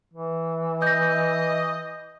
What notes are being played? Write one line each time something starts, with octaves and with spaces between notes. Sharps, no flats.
E3
D#5 G6 A#6